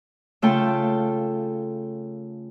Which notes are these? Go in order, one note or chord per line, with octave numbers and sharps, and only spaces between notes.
C#3 A3 F4 A4 G5 A5